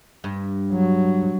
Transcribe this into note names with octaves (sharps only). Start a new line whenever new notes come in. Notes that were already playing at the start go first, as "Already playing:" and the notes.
G2
F#3